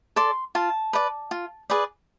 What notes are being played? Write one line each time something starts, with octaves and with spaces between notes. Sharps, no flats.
A4 D5 C6
F4 A5
B4 D5
F4
G#4 B4 D5